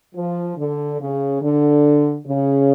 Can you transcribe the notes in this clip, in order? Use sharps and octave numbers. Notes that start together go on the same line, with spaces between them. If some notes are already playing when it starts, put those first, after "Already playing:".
F3
D3
C#3
D3
C#3